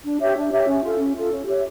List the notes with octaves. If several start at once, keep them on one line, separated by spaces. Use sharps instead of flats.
D4
G4 C#5 E5
D4
G4 C#5 E5
C#4
F4 A4
C#4
F4 A4
C#4
G4 C#5 E5